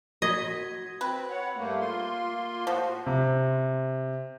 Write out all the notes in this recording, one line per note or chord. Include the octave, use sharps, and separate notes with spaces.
F#4 D#5 G#6 B6
C4 B4
C#5 F#5
G2 A3 A#3
A#3 F4 C6
A2 F3 F#4
C3